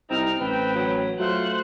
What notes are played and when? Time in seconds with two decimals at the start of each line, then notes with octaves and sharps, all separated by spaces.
0.10 C2 C4 D#4 A#5 F6
0.40 A1 B4 G5
0.75 F#3
1.20 F#3 A3 F4 C5 F#6